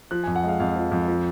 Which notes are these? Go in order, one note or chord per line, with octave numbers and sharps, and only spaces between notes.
F3 F#6
F2 G#5
F#5
G#3 F5
F2 F5
F3
F2
F3